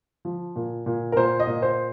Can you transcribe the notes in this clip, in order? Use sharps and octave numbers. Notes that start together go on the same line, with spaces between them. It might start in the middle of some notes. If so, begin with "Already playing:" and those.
F3
A#2
A#2
A#4
A#2 C5
D#5
A#2
C5